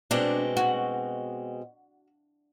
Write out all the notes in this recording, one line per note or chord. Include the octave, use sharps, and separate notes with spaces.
B2 G#3 C4 D4
F#4